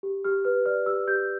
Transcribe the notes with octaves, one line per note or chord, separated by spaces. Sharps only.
G4
G4 F6
B4 F6
D5 F6
G4 E6
G4 G6